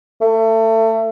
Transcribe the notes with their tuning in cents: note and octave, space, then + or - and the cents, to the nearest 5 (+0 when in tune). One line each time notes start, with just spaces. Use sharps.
A3 +25